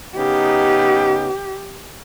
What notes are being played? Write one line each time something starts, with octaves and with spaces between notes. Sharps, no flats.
C#3 B3 D#4 G4